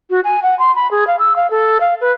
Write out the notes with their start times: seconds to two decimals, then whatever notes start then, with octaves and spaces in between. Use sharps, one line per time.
0.10 F#4
0.24 G#5
0.43 F#5
0.59 C6
0.76 B5
0.91 G#4
1.07 F5
1.19 E6
1.36 F5
1.50 A4
1.80 F5
2.01 B4